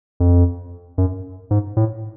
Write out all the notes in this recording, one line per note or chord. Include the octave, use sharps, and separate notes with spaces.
F2
F#2
G#2
A2